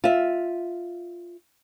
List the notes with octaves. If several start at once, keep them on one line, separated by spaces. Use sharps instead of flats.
F4 E5